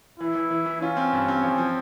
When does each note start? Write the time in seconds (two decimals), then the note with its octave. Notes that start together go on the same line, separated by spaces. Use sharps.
0.20 E3 E4
0.35 E3
0.50 E3
0.66 E3
0.82 C#4 F4
0.97 C4
1.13 G2
1.28 C4
1.44 F3
1.58 F3